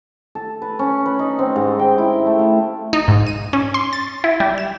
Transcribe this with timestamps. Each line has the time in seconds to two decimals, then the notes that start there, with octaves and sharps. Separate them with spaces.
0.35 A4
0.62 B4
0.79 C#4
1.06 B4
1.19 D#4
1.39 C4
1.56 G#2
1.79 G5
1.98 E4
2.27 A3
2.39 F5
2.93 D#4
3.08 G#2
3.27 D#7
3.53 C#4
3.74 C6
3.93 A6
4.24 E4
4.40 G3
4.58 E7